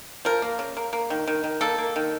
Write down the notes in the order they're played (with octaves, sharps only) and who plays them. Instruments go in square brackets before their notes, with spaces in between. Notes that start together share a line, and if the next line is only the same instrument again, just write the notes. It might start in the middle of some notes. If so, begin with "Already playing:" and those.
[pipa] F3 A#4
A#3
C#3
A#3
A#3
D#3
D#3
D#3
A#3 A4
A#3
D#3